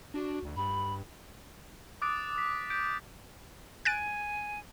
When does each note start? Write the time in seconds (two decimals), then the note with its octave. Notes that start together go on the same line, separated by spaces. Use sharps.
0.14 D4 F#4
0.43 D2
0.56 G2 B5
2.02 D6 D#6 F#6 A6 D7
2.38 B6
2.70 G6 B6 D7
3.85 G#5 F#6 A6 D7